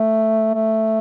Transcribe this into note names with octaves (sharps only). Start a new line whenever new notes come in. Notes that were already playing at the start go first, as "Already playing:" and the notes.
Already playing: A3
A3